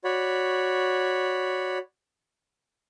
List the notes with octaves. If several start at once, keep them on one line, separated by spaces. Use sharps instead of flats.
F#4 C#5 D5 B5